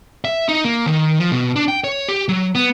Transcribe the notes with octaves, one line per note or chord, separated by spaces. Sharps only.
E5
D#4
A#3
D#3
F3
B2
D4
G5
C#5
G4
F#3
B3